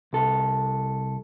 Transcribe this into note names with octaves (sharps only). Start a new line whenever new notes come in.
C2 A4